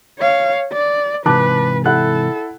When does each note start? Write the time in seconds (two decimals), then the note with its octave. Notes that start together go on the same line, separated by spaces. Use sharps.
0.19 C#5 F5
0.73 D5
1.26 G#2 C3 E3 B4 A5 D6 F#6
1.86 E4 A4 F#5 F#6